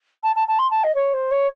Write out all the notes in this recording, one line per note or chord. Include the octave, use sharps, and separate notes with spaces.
A5
A5
A5
C6
A5
D#5
C#5
C5
C#5